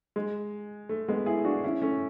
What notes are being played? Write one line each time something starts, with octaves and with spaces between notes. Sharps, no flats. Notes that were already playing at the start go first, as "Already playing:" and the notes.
G#3
A3
G#3 B3
E4 G#4
D4 F#4
C#4 E4
A3 C#4